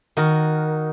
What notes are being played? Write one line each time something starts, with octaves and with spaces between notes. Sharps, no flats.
D#3 F#4 A#4